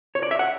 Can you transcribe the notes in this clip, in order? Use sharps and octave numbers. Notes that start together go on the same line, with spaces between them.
C#5
D5
E5
F#5